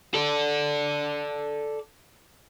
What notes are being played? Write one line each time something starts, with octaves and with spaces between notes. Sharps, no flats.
A4 D5